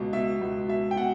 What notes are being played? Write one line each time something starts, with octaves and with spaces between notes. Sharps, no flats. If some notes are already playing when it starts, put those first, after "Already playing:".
Already playing: C#2 B2
B2 E5
C#2
B2 E5
G5
B2 F#5